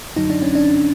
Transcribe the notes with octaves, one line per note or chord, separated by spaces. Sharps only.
F#2 D3 F#3 D#4
D4
C#4
D4